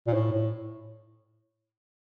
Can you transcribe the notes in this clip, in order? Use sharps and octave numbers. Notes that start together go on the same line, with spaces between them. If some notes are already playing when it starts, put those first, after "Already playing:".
A#2
A2
A2